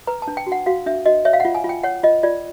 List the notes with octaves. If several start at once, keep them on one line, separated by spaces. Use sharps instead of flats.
B4 A#5
A5
D4
G5
F#4
F#5
F#4 F5
D4 E5
F#4 D#5
C#5 E5
F5
F4 F#5
G#5
F4
G5
C#5 F#5
F4 D#5
F4 D5